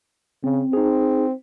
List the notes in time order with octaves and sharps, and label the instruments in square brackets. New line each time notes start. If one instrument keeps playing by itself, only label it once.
[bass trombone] C#3 [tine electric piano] C4
[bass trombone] C4 [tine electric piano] D#4 G#4